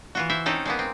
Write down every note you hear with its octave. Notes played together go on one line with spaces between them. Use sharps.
E3 F4 F#4
E4 C5 E5
C4 C#4 D#4 A4
G#3 A#3 B3
C4